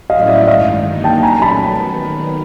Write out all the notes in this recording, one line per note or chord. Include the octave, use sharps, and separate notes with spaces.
A2 F#3 A3 C#4 E4 D#5 F5
D#5
D5 E5
E5
G2 D#3 G#3 D#5 F5
D3 F#3 A#3 D#4
G5 A5
A#2 F#3 A3 C#4 G#5 A#5
A5 B5
D#3 F#3 B3